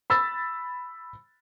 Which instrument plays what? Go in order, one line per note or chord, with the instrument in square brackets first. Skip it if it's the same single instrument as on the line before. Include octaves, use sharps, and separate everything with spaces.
[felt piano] B5 E6 A6